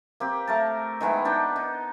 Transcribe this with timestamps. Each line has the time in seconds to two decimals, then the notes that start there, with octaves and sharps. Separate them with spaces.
0.20 A#3 C4 G4
0.47 A3 A#4 A5
1.01 D#3 G#3 B3 E4
1.25 D4 D#4 G5 A5
1.56 D#4